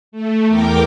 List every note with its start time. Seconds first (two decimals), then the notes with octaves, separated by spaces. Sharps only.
0.12 A3
0.46 E2 A#4 G5 D6